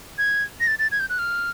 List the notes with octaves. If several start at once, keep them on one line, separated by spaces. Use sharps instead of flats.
G#6
A#6
A6
A6
G#6
G6
F#6
F6